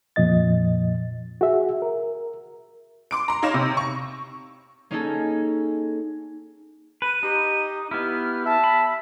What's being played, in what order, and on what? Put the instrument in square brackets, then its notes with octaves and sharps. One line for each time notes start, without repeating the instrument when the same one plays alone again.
[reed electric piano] F2 A#2 F3 D#5 A6
F#4 G#4 E5
A#4
[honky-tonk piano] C6 D6 D7
A#5 C6
D#4 C#5 F5 A#6 E7
C3
C#6
[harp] A#3 C#4 D#4 G#4 A4
[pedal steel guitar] B4 [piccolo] D#7
[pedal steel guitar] D#4 [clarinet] G4
[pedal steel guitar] B3 E4 [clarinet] G4 [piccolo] F6
[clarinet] E5 [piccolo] A5
[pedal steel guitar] B5